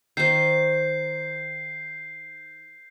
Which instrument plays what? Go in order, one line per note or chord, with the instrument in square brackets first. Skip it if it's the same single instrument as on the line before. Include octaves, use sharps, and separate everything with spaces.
[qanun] D#3 C5 [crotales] G6 C7